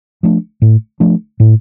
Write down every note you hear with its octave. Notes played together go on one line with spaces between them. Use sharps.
F3 A3 D4
A2
F3 A3 D4
A2